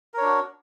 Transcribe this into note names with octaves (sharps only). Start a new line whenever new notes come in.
D4 F#4 A#4 C#5